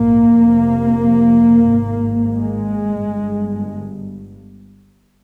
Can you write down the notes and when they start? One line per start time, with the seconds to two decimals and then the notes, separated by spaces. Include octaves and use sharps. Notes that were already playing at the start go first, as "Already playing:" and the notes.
Already playing: A#1 G#2 A#3
0.35 F1 F2 C3
1.68 G#1 G#2
2.34 G#3
3.00 G1 G2